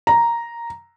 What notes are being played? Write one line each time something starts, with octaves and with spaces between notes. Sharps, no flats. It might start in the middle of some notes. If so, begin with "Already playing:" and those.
A#5